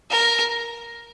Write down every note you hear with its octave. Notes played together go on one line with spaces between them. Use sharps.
A#4